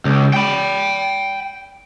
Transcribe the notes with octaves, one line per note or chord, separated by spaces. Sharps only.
C#2
G5 B5